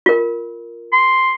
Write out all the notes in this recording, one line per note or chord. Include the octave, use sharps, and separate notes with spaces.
F4 A#4
C6